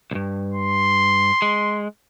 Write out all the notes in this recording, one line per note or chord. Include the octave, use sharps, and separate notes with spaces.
C2 G2
C6
G#3